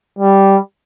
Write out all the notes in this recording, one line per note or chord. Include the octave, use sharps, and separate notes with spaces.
G3